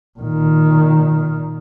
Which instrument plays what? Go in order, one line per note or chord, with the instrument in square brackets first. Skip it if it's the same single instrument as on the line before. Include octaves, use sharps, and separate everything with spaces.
[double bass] A#2 D#3